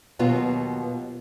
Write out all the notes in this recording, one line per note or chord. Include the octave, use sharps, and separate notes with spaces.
D#2 B2 F#3 B3 F4